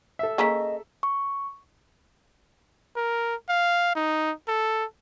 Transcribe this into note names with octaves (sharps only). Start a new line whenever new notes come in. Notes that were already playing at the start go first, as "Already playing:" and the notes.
A4 E5
A#3 C#4 G#4 D#5 A#5 B6
C#6
A#4
F5
D#4
A4